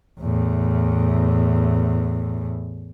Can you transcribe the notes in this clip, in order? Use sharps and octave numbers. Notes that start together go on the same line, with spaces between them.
E2 A2